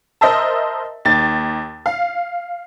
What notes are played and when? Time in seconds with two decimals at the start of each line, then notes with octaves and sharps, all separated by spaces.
0.21 A#4 C5 D#5 E5 A5
1.05 D#2 A6
1.86 F5